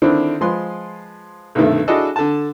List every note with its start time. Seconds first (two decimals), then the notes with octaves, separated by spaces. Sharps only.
0.02 D3 D#3 C4 D4 E4
0.41 F3 G#3 B4 C6
1.55 B1 G2 C3 D#3 A3
1.88 D4 E4 F#4 G#4 A4 D#5
2.16 D3 A5